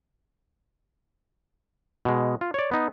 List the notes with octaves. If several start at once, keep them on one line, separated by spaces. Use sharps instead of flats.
B2 G#3
F4
C#5 D5
B3 D#4